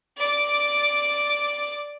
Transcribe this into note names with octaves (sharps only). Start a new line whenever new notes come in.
D5 D6